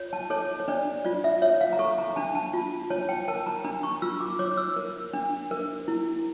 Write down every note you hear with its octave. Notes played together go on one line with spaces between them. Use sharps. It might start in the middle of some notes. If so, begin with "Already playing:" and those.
Already playing: F4 C#5
A5
A4 C#5
C#5
D4 D5
F4 D5
E5
C#5 E5
F5
A#5
A4 C#6
A#5
D4 A5
A5
F4
C#5 A5
G5
A#4 A5
A#5
D4 A#5
C#6
F4 E6
D6
C#5 D6
E6
A#4
D4
A#4
E4